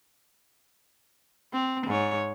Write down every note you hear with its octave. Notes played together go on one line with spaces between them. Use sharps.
C4
G#2 C#5